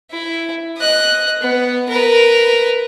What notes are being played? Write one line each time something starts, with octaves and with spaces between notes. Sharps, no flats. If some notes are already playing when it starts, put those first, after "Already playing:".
E4
D#5 F#6
B3
A#4 B4